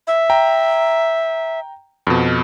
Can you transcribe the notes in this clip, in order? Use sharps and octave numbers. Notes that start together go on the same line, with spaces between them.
E5
G5 A#5
F2 B2